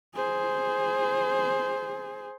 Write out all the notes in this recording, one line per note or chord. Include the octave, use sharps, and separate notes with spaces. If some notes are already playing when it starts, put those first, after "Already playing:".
G#4 C5